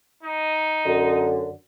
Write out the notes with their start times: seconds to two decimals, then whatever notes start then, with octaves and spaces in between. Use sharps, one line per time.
0.23 D#4
0.84 F#2 D3